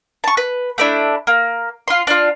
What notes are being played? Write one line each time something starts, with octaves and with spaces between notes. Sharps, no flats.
A5 C#6
B4
A3 D4 E4
A#3
F4 C6
D4 F4